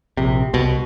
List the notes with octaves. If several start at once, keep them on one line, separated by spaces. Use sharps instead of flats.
A#1 C3
C2 B2